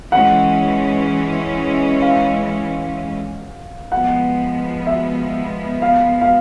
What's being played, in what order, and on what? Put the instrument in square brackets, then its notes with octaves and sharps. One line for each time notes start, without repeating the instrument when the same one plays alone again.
[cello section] E3 G#3 C#4 [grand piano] F#5
[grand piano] F5
[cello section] F3 G#3 B3 [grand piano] F#5
[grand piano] E5
F5
F5